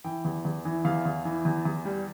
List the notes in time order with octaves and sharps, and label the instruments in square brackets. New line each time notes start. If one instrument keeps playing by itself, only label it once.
[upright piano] E3 G5
E2
E2
E3
E2 F5
E2
E3
E2
E2
G3